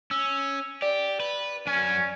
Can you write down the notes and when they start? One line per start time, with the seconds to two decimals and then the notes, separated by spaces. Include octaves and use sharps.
0.11 C#4 E6
0.82 G4 D5
1.20 B4
1.67 F#2 C#4 G#5